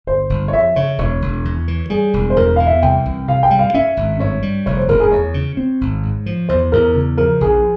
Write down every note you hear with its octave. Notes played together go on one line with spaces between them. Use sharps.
G1 C5
G1
C#5
F2 E5
C#3 C#5
E1 C#5
E1
E2
E3
G3 G#4
E1
C5
E2 A#4
E3 F5
E5
C2 G5
C2
C3 F5
G5
G3
F5
C#4 E5
G#1
G2 C#5
G3
F1 C#5
C5
F1 A#4
G#4
E2 C#5
C#3
C4
G#1
G#2
F3
E2 C5
E2 A#4
C#3
F3 A#4
A#1 G#4